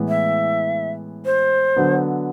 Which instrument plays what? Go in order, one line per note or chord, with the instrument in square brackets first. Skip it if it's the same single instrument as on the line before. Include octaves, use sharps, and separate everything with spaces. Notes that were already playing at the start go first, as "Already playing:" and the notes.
Already playing: [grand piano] A2 E3 G#3 B3
[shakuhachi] E5
C5
[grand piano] D3 F#3 B3